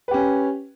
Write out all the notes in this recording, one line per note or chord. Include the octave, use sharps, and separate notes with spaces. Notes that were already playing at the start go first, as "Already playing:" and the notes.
C#4 G4 B4